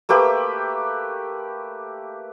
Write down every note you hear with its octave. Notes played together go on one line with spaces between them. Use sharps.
A3 A#3 G4 B4